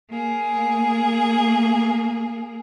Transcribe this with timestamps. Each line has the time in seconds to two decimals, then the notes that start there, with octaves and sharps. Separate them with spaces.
0.10 A#3 G#4